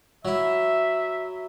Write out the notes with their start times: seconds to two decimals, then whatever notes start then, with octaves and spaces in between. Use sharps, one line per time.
0.25 F#3 E4 E5